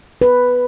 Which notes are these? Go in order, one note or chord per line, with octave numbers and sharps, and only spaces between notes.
B4